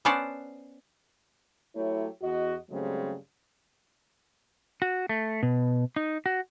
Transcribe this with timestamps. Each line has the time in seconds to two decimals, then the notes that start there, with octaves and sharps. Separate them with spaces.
0.05 B3 C#4 C5 D5 F#5 A5
1.75 F#3 A3 E4 G4 C#5
2.21 E2 F#4 D#5
2.70 G2 C#3 F#3 G#3 A3 C4
4.82 F#4
5.09 A3
5.43 B2
5.96 D#4
6.26 F#4